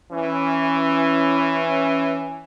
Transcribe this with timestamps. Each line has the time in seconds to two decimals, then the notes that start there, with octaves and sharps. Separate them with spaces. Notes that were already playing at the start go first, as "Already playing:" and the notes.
0.12 E3 C#4